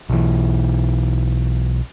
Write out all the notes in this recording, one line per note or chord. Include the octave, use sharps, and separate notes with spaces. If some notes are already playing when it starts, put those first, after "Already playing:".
B1 E3